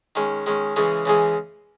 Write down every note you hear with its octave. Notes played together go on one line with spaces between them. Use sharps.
D#3 G#3 C#4
D#3 G#3 C#4
C#3 E3 G#3 C#4 G#4
C#3 E3 G#3 C#4 G#4